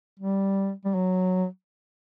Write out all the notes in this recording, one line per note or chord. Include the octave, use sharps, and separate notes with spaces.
G3
G3
F#3